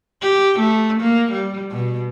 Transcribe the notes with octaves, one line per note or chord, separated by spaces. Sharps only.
G4
A3
A#3
G3
B2